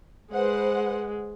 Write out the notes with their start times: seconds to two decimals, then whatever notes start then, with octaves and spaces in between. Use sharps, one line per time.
0.33 G#3 B4 C5 F#5